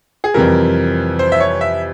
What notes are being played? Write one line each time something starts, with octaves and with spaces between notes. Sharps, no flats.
G#4
F2 C3 E3 G3 A#4
C5
E5
C#5
E5